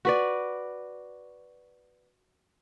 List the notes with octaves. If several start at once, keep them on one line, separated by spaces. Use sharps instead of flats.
F#4 B4 D5